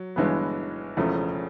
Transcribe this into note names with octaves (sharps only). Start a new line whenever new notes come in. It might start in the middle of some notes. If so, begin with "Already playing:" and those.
Already playing: F#3
G1 G2 E3 G#3 B3
E1 E2 C#3 F3 A3